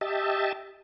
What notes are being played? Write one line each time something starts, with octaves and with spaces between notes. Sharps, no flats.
G4 D#5 E5 A5